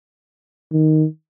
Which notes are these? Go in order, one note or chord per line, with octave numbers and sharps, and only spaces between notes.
D#3